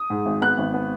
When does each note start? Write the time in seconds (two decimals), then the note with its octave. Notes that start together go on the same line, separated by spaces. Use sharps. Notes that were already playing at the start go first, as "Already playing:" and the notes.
Already playing: D#6
0.10 G#2
0.26 G#1
0.42 B3 F#6
0.58 G#1
0.74 B3